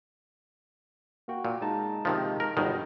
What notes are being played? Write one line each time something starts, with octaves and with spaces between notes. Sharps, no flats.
A#3 F#4 G5
A#2
G#3 D#4 A5
C3 D#3 F3
A#4
G1 B2 D#3